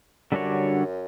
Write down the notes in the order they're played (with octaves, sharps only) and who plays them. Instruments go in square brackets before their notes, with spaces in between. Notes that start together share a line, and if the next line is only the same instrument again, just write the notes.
[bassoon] F#2 [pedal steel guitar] D3 G3 D4 F#4 C#5